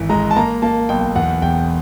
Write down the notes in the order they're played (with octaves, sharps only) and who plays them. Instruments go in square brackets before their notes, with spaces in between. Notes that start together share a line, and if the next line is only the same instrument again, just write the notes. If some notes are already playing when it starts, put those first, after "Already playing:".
Already playing: [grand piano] G#1 E3
G#3 A#5
A5
A#3 A#5
A#3 A5
B1 G5
E2 F#5
E1 G5